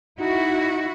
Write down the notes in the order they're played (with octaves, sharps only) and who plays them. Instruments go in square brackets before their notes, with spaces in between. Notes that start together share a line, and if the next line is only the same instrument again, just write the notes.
[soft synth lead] D#4 [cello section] E4 F#4